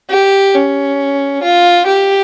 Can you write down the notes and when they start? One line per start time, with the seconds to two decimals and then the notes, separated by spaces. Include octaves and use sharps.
0.10 G4
0.55 C#4
1.42 F4
1.86 G4